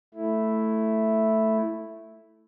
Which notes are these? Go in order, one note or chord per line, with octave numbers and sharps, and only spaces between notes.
A3 E4